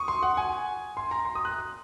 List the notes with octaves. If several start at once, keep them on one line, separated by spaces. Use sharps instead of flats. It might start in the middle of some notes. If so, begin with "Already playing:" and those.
Already playing: C#6 D#6
C6
F#5
G#5
C6
A#5
C6
D#6
F#6